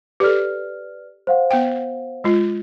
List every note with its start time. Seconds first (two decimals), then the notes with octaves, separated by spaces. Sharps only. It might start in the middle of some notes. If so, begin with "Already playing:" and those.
0.20 G4 A4 B4 D5 F6
1.27 C5 F5 F#5
1.51 B3 G5
2.24 G#3 F4